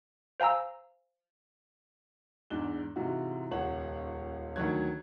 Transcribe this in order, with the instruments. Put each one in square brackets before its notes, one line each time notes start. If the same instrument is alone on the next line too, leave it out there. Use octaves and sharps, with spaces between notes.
[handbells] C5 F5 G#5 A#5 E6
[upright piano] E2 G#2 D4 F#6 G7
G#2 C3 E3 F4 F#4
D#1 C#2 C#5 F#5 F#7
D2 D#3 F#3 C#5 F#6 G#6